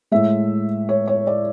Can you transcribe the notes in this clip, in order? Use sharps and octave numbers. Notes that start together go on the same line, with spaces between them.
A2 G#3 E5
C#5
C#5
D5